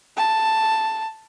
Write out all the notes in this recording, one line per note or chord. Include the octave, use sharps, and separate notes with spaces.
A5